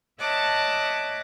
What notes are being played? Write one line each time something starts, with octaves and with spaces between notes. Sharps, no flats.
C#5 D#5 E5 F#5 A5 D6